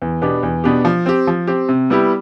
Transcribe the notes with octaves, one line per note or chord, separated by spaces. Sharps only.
E2
B2 B3 D4 G4
E2
B2 B3 D4 G4
F3
C4 G4
F3
C4 G4
C3
G3 B3 E4 G4